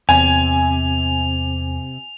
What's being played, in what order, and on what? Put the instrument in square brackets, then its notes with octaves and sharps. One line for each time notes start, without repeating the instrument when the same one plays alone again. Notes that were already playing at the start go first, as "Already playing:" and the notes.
[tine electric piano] E2 [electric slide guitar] C3 [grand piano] G#5 [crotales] F7